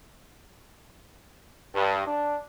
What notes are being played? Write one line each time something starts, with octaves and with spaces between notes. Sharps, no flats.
G2
D4